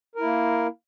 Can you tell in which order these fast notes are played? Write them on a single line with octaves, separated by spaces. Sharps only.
A#4 E4 A#3